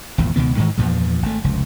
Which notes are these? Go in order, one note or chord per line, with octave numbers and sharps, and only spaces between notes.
G#1 E2 A#2
C#2 B2 D#3 B3
G#2 D#3 E3 G#3
E2 G2 A#2 F3
G#1 A3
F1 C#2